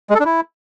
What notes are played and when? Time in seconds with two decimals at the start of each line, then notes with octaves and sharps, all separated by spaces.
0.10 G#3
0.15 A4
0.20 D4
0.25 E4